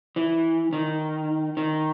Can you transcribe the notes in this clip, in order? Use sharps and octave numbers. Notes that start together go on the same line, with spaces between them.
E3
D#3
D#3